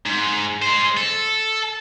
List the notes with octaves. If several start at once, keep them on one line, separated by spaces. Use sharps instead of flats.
G#2
G#3 C5
A4